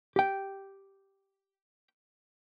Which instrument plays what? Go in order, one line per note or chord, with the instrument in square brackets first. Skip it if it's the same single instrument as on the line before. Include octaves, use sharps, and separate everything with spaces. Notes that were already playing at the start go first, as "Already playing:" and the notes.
[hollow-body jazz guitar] G4 G5